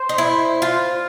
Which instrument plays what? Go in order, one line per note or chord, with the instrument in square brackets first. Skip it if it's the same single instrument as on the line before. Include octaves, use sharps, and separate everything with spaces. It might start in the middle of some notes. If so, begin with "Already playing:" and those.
Already playing: [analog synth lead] C5
[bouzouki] D#4
E4
F4